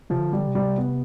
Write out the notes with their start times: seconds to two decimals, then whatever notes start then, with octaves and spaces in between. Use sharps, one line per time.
0.10 C3 F3
0.19 D3
0.33 G3
0.48 C3
0.55 G3
0.77 B3